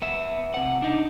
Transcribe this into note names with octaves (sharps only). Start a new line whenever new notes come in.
B3 E5
C3 F#5
D4 D#4